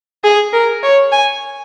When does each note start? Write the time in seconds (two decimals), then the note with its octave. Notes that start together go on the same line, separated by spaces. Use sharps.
0.24 G#4
0.53 A#4
0.83 C#5
1.12 G#5